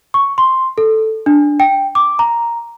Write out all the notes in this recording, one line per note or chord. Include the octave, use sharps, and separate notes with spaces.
C#6
C6
A4
D4
G5
D6
A#5